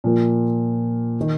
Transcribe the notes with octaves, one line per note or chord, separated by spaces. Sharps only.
A#2 F3 A#3
D#3